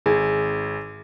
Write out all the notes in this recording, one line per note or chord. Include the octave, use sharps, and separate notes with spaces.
G#1 G#4 G#5